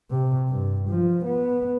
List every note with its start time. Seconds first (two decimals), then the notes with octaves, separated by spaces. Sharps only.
0.11 C3
0.49 G2
0.89 F3
1.26 B3